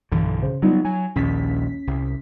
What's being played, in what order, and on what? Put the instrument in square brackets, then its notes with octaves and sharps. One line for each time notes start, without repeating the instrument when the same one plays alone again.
[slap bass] B1 D3 [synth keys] G2 E3
[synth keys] C#3 C5
[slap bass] F#3 B3 [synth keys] G3 D#4 F4
[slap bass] F#3 [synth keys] G#5
[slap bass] A#1 D#2 [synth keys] C#4 B6
[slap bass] C2